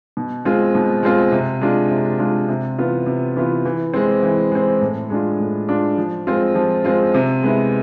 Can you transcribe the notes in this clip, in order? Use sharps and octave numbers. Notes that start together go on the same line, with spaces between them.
B2
G#3 C4 F4
B2
G#3 C4 F4
C3
G#3 D4 F4
C3
G#3 D4 F4
C3
E3 B3 F4
C3
E3 B3 F4
E3
G#3 C4
E3
G#3 C4
A2
G#3 D4 F4
A2
G#3 D4 F4
F3
G#3 C4 F4
F3
G#3 C4 F4
C3
G#3 B3 E4